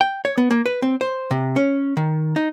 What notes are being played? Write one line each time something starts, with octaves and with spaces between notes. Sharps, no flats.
G5
C#5
B3
A#3
B4
C4
C5
C3
C#4
D#3
D#4